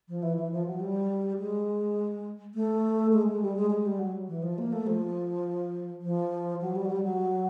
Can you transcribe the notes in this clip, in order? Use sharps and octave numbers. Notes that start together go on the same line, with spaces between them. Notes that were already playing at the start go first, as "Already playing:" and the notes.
F3
E3
E3
F3
F#3
G3
G#3
A3
G#3
G#3
G3
G#3
G#3
G3
F#3
E3
F3
A#3
A3
F3
F3
F#3
G3
F#3
G3
F#3